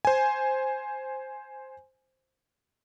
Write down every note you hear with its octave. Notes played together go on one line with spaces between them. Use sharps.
C5 G#5